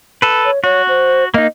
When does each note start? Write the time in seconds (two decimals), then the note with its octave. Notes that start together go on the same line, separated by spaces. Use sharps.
0.22 A4 B4
0.45 C#5
0.64 F#4 C#5
0.88 C5
1.34 A#3 D#4 D#5